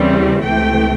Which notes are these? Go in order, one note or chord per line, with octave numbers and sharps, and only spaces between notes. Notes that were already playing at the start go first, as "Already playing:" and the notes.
Already playing: D#2 C#3 E3 G3 C4
C#2 C3 E3 A3 G5